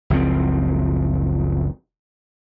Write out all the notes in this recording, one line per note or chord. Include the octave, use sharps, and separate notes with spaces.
F#1 C#2 F3 C4